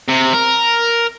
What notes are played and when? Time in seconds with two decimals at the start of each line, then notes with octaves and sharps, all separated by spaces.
0.09 C3
0.34 A#4